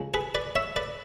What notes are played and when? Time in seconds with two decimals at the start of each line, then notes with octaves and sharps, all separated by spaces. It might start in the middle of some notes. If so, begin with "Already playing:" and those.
Already playing: C#2 C#3 G#3
0.14 G#4 B4
0.35 B4 D5
0.56 C#5 E5
0.76 B4 D5